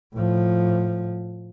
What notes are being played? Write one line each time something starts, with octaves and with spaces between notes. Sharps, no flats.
A2 F3